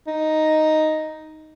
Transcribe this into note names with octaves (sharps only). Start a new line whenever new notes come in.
D#4